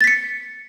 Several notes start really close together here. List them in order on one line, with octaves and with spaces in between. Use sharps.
A6 B6 C#7